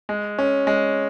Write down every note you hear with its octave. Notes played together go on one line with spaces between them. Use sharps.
G#3
C#4
G#3